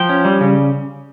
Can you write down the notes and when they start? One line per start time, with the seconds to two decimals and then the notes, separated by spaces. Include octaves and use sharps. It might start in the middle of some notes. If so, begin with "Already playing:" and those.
Already playing: F3 G5
0.09 C#4
0.25 G3
0.41 C#3